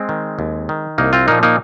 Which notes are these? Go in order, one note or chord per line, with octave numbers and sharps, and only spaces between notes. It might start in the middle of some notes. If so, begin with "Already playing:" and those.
Already playing: G#3 C4
D#3
D#2
D#3
C2 A#3 D#4
C4 F4
A#2 F3 A#3 D#4
A#3 D#4